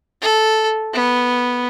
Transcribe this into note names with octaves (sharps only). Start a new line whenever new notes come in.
A4
B3